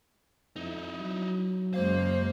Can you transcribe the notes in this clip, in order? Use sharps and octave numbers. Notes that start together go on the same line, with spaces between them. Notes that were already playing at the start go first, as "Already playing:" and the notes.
F2 D#4 E4
F#3
F#2 C#3 G#3 A#3 C5 F5